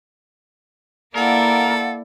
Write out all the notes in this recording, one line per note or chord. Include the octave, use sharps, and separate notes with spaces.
A#3 E4 A4 A#4 D5 F5 F#5